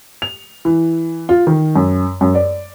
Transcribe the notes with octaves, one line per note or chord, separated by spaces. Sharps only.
F7
E3
F4
D#3
F#2
F#2
D5